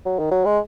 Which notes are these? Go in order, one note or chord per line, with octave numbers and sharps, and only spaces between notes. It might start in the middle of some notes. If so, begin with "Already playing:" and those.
F#3
D#3
F#3
G#3